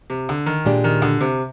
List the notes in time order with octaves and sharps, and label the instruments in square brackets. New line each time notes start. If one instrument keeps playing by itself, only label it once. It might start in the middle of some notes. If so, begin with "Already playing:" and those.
[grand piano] C3
D3
D#3
[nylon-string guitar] A#2 G#3 D4 G4 D5
[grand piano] D#3
D3
C3